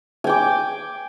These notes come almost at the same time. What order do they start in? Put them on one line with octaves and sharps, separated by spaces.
G#5 G5 D6